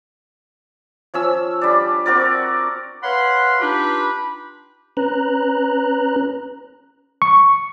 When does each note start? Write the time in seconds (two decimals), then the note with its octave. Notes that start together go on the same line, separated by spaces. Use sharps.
1.14 F3 C#4 E6
1.61 G3 D4
2.06 C4 F#4 A#4 D5
3.03 B4 C#5 F5 F#5 B5 C6
3.61 D4 D#4 F4 G4 B4 B5
4.97 C#4 B4 A#5 F#6
7.22 C#6